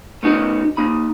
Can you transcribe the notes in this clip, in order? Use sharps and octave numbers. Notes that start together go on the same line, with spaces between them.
A3 B3 D#4 F#4
A#3 D#4 B5